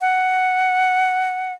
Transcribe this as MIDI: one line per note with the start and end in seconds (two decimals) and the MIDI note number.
0.01 1.53 78